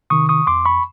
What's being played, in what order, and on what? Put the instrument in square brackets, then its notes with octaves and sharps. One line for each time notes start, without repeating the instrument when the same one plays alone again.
[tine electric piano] C3 D#3 C#6 D#6
C#6 D#6
F2 C6 D6
B5 C#6